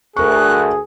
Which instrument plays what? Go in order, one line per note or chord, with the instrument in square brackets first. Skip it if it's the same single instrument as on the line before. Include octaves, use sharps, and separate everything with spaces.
[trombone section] D2 [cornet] G#4 [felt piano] A#4 C#6 [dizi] F#6